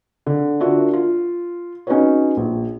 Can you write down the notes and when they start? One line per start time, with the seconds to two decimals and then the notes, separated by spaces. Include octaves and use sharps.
0.26 D3
0.60 D4 F4 F#4 A#4 D5 E5
0.93 F4
1.87 C#4 D#4 F#4 G#4 B4 C#5
2.37 A#1